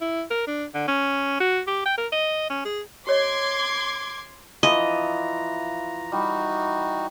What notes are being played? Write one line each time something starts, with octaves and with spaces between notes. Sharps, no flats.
E4
A#4
D4
D3
C#4
F#4
G4
G5
A#4
D#5
C#4
G#4
G4 C#5 D#5 C6 D6 G#6
E3 F3 D#5 A#5
G3 D#4 F#4